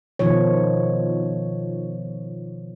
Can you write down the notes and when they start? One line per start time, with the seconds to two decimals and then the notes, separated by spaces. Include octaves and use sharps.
0.19 B2 D#3 F3 C#5